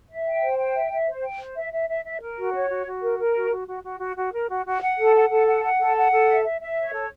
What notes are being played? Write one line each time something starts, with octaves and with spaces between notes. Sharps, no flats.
E5
G5
C5
G5
E5
E5
C5
G5
C5
E5
E5
E5
E5
A#4
F#4
C#5
F#4
F#4
A#4
A#4
F#4
F#4
F#4
F#4
F#4
F#4
A#4
F#4
F#4
F#5
A4
F#5
A4
F#5
F#5
A4
F#5
A4
E5
E5
E5
C#5
A4